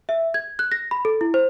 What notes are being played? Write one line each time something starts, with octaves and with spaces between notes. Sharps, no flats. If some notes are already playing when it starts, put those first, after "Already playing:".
E5
G#6
F#6
A#6
B5
A4
E4
C5